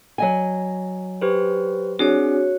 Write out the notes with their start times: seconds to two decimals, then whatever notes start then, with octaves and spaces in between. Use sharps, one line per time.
0.18 F#3 D#5 G#5
1.21 G4 B4 C5
1.99 C4 D4 F#4 G#4 C#5